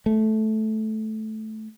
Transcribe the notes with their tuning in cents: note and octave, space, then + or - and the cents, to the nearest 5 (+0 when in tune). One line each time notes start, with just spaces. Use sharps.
A3 -10